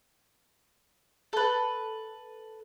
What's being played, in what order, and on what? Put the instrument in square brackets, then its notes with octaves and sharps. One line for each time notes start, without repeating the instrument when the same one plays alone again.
[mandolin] A4 B4